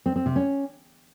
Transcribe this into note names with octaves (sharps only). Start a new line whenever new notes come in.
C4
C4
C3
C#4